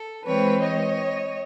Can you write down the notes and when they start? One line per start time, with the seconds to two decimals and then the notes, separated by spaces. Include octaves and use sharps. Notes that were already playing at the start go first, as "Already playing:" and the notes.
Already playing: A4
0.25 E3 G#3 C4 B4 C#5
0.62 C#5 D#5